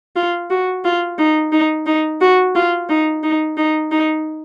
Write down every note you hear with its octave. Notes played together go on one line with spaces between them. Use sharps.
F4
F#4
F4
D#4
D#4
D#4
F#4
F4
D#4
D#4
D#4
D#4